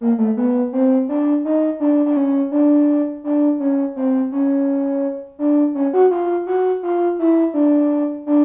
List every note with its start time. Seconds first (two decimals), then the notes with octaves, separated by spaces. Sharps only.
0.01 A#3
0.18 A3
0.37 B3
0.73 C4
1.09 D4
1.45 D#4
1.80 D4
2.06 D4
2.17 C#4
2.52 D4
3.24 D4
3.60 C#4
3.96 C4
4.32 C#4
5.39 D4
5.75 C#4
5.93 F#4
6.11 F4
6.47 F#4
6.83 F4
7.19 E4
7.54 D4
8.26 D4